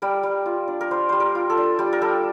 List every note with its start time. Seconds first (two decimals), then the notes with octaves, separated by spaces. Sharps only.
0.02 G3 A#4
0.23 G3
0.46 F4
0.68 D4
0.81 A#4
0.91 G3 C5
1.09 G3 C5
1.20 A#4
1.35 F4
1.50 A4
1.57 D4
1.79 G3 G4
1.93 A#4
2.01 G3 A4